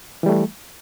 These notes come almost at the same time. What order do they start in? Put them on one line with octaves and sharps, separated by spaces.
E3 G3 A3